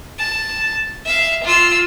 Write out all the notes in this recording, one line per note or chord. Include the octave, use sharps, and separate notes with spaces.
A5
E5 F5
F4 E6